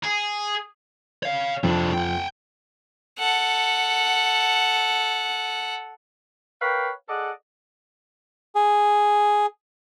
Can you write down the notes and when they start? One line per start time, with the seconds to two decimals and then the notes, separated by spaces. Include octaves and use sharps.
0.04 G#4
1.23 C#5 F5
1.64 F2 C3 F3 D4
1.93 F#5 G5
3.19 A4 F#5
6.61 A#4 B4 C#5 F5 G5
7.08 G#4 A4 D5 D#5 F#5
8.55 G#4